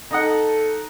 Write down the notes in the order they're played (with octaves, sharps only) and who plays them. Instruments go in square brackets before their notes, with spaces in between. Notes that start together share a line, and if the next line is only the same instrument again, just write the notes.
[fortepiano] D#4 D#5 F#5 [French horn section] A4